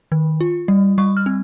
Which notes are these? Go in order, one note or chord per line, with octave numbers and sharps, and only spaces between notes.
D#3
F4
G3
G3 C#6
F6
C4